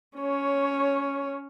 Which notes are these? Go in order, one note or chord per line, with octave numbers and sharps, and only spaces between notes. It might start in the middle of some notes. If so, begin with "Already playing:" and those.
C#4 C#5